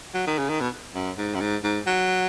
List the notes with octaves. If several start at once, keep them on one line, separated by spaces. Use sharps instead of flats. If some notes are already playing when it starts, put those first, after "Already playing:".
F#3
D#3
C#3
D#3
B2
F#2
G#2
F#2
G#2
G#2
F#3